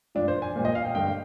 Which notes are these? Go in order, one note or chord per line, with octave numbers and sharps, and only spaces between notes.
G2 F3 D4
C5
G#5
A#2 G3
D#5
F5
G5
G2 D3 G3 G5